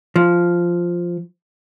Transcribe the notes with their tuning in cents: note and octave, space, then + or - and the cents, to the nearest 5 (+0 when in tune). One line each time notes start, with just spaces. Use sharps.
F3 -5